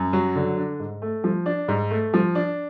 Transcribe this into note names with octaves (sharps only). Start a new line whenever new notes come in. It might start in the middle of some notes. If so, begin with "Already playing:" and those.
Already playing: F#2
F#3
D3
D4
G#2
A3
F3
D4
G#2
A3
F3
D4